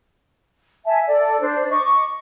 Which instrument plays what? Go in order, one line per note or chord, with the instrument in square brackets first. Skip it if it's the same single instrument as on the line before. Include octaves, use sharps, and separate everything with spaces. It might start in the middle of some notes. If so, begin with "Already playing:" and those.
[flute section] E5 G#5 A5
A4 D5
D4 C5
D#5 C#6 D6